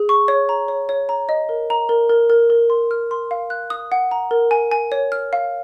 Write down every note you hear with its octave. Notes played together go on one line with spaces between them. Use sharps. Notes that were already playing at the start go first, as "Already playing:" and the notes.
Already playing: G#4
C#6
C#5
A#5
C#5
C#5
A#5
D#5
A#4
A#5
A#4
A#4
A#4
A#4
C6
F6
C6
F5
F#6
D#6
F#5
A#5
A#4
G#5
G#5
C#5
F6
F5